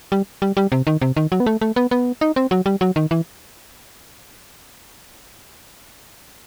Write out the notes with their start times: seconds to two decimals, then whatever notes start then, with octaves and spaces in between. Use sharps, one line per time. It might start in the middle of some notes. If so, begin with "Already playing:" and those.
0.12 G3
0.42 G3
0.57 G3
0.72 C3
0.87 D#3
1.02 C3
1.17 D#3
1.32 F#3
1.40 B3
1.46 A3
1.61 A3
1.76 B3
1.91 B3
2.21 D#4
2.36 C4
2.51 F#3
2.66 G3
2.81 F#3
2.96 D#3
3.11 E3